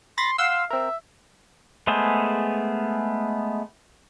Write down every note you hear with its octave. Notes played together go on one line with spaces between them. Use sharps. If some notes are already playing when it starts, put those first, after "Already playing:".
B5 C6 A6 A#6
F5 F#5 C6 E6
C4 A#4 E5
G#3 A3 B3 G#4 C5